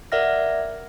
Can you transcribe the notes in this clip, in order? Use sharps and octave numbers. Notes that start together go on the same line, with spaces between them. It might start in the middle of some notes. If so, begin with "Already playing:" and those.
A#4 D5 E5 F#5 F6 A#6